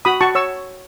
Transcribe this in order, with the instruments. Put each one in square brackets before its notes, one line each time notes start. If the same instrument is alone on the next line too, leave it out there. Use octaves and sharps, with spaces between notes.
[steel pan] F#4 B5 D#6
F#4 A5 C#6
C#5 C#6 E6